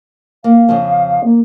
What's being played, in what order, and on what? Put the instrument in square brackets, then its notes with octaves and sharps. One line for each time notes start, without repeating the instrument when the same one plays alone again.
[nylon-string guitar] A#3 [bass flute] F5
[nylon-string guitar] F2 C#3 F3
[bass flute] A#3